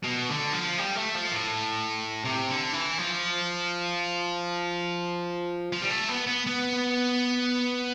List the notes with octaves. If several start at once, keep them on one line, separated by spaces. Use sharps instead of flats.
B2
D3
F3
G3
A3
F3
A2
C3
D3
E3
F3
F3
G3
A3
B3
B3
B3